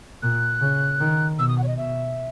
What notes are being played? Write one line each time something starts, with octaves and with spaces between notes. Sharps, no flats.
A#2 F#6
C#3
D#3
B2 E6
D#6
F#5
C#5
D#5
B2 E5